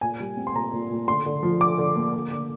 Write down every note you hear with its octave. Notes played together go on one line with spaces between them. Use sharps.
A#2 G#5
G3
C4
C6
A#2 A#5
A#2
A#2
D3 C6
D3
F3
D3 D6
D3
A#3
D3
D3